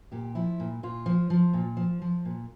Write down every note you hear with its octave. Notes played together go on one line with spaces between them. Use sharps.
A#2 G4
F3 E4
A#2
A#2 F4
F3
F3
A#2
F3
F3
A#2